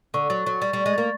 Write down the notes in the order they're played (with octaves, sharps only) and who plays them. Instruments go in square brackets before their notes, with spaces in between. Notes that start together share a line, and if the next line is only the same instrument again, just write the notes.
[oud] D3 [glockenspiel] C#6
[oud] F#3 [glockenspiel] A6
[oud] F#3 [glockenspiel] C#6
[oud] G3 [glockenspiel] A6
[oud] G3 [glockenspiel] C#6
[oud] G#3
[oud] A#3 [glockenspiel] A6